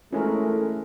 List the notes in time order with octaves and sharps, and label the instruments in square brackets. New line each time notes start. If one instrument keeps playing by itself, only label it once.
[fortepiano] E3 G#3 [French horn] A3 [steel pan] C#4 A#4